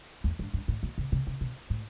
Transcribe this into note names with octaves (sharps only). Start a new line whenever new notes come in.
E2
G2
G2
A2
B2
C3
C3
C3
B2
A2